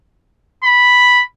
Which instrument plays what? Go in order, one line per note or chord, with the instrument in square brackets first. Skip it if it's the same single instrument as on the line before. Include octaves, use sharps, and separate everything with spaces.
[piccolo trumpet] B5